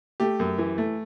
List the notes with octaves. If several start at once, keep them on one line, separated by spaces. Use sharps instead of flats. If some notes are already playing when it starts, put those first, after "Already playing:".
A3 G4
F#2
E3
A3